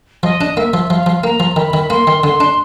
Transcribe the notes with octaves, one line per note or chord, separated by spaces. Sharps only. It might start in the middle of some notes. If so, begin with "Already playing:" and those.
F3 D#5
D4
A#3 E5
F3
F3 F5
F3
A#3 A#5
F3
D#3 B5
D#3
A#3 C6
D#3
D3 C6
D4